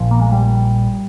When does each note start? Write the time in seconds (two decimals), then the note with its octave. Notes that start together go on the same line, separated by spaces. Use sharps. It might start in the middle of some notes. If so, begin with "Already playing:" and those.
Already playing: A#1 A#2 F3
0.11 A#3
0.21 G#3
0.32 G3